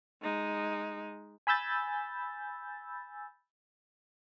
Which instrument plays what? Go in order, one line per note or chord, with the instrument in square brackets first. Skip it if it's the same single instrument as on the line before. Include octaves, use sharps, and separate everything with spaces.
[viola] G#3 D#4
[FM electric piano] G#5 B5 E6 G6 A6